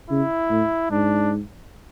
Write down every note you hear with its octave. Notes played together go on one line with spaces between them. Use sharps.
C#3 E4
A2
G#2 D4